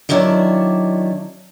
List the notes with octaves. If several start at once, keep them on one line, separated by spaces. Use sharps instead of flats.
D#3 F#3 D4 E4 D5